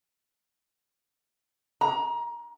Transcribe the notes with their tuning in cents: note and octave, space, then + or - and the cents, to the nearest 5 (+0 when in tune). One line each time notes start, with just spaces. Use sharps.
A#5 +25